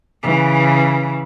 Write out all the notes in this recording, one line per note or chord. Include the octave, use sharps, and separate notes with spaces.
C#3 E3